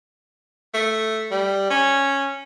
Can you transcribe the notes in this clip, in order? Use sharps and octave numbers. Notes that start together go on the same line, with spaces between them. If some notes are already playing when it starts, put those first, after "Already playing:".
A3
G3
C#4